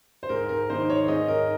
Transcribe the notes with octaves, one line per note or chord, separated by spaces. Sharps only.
C5
G#2 A#4
A#4
D#3 A#3 D#4 C5
C#5
G#2 D#5
A#4